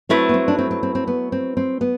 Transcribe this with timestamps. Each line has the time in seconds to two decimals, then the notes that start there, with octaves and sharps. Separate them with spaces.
0.09 F#3 A3 C4 E4 B4
0.29 B3
0.34 C4
0.48 D4
0.59 C4
0.71 C4
0.83 C4
0.95 C4
1.07 B3
1.32 C4
1.57 C4
1.81 B3